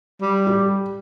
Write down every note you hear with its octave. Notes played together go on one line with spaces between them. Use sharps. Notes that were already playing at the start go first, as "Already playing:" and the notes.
G3
G4